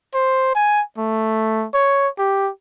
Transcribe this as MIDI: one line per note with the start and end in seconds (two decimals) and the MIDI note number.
0.14 0.53 72
0.55 0.82 80
0.98 1.66 57
1.74 2.08 73
2.19 2.50 67